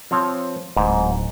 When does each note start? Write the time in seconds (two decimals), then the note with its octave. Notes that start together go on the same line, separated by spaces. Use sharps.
0.11 F3 C4 C#5
0.76 D1 G#2